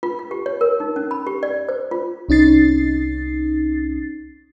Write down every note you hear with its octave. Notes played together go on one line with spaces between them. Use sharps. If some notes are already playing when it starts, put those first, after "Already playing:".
F4
F4
G4
C#5
A#4
D#4
C#4
B5
G4
D5
C5
F4
C2 C#4 D#4 A6 C7